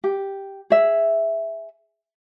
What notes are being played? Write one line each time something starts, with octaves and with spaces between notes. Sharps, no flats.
G4
G#4 E5